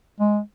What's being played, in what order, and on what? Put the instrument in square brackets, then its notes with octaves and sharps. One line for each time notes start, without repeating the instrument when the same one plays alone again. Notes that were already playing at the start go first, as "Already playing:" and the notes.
[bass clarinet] G#3